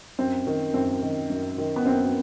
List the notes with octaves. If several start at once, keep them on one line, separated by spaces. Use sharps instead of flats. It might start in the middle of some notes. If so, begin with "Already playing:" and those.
F#2 C4
D#3
F#2 C4
D#3
F#2
D#3
B3
F#2 C4